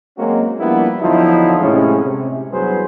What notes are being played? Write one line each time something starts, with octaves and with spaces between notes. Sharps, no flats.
F#3 G#3 A#3 C4 C#4 F#4
F3 G3 A#3 B3 D4 E4
E2 D3 F3 F#3 D#4 E4
A2 C3 G#3 C#4
C3
E2 G2 F#3 G#4 B4 C5